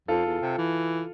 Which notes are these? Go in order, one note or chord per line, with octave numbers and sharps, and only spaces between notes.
F2 F4 A4
E2
C3
E3